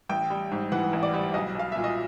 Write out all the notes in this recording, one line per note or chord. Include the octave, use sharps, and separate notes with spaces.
A1 G5
G3
G#2
E3 F#5
A1
D5
G3
B1 D#5
B1 F5
A#2 E5
D#5